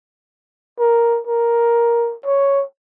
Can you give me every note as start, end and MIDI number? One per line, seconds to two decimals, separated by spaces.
0.79 1.20 70
1.27 2.15 70
2.25 2.63 73